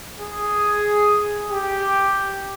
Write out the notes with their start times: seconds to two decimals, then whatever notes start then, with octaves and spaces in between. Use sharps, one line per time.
0.19 G#4
1.51 G4